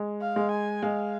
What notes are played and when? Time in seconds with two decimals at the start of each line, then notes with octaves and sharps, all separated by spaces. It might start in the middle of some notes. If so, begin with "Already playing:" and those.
Already playing: G#3
0.21 F5
0.36 G#3
0.52 G#5
0.83 G#3 F5